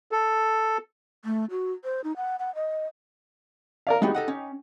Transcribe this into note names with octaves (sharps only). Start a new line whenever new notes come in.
A4
A3
F#4
C5
D#4
F#5
F#5
D#5
A#4 D5 F5
G#3 B3 D#4 F#4 G4
A4 D#5 F#5
C#4